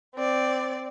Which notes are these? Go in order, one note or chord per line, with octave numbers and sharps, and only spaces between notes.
C4 D5